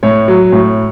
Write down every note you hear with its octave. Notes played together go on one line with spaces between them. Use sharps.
A2 C#5
F#3
A2